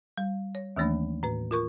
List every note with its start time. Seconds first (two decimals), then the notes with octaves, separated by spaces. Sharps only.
0.18 G3
0.55 C#5
0.76 D#2 D#3 E3 A3 A#3 D4
1.23 A2 B4
1.51 F4 A#4 C#6